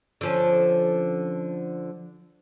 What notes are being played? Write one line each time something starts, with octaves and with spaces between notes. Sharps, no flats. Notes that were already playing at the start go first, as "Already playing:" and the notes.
D3 F3 C#4